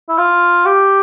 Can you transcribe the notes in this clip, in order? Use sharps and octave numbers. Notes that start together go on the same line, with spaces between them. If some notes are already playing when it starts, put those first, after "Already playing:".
E4
F4
G4